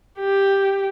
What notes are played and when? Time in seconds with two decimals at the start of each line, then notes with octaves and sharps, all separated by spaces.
0.19 G4